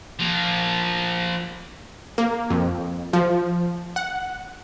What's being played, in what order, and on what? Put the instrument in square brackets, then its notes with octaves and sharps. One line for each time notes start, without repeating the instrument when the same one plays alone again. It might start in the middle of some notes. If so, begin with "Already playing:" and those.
[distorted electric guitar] F3 A#3
[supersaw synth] A#3
F2
F3
F#5